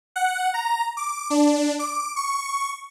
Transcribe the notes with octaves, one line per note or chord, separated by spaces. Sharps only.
F#5
A#5
D6
D4
D6
C#6